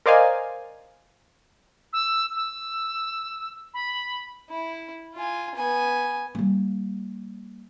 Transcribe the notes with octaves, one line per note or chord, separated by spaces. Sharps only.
A#4 C5 D5 D#5 F5 G#5
E6
E6
B5
E4
F4 G#5
B3 G#5
G3 A#3